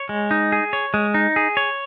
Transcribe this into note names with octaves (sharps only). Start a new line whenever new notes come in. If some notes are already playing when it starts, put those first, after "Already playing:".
Already playing: C#5
G#3
D#4
G#4
C#5
G#3
D#4
G#4
C#5